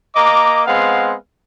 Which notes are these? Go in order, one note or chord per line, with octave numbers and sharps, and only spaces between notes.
A#3 D#5 A#5 D6
G#3 B3 C4 F5 F#5